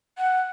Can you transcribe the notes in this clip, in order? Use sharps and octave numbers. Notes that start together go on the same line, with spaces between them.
F#5